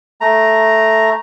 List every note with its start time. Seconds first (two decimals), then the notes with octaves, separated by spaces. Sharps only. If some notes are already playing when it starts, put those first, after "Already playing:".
0.21 A3 A#5